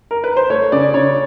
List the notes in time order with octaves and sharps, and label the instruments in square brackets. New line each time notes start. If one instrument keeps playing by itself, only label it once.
[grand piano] A#4
B4
C5
A3 C#5
C#3 D5
C#3 C#5